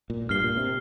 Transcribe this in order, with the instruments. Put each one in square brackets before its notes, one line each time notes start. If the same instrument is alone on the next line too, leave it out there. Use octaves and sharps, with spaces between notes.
[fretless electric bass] A#2
[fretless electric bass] G2 [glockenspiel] F6 C7 G7
[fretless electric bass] A#2
C3